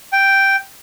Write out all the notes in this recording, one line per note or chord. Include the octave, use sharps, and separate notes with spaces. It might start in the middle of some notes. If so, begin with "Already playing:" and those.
G5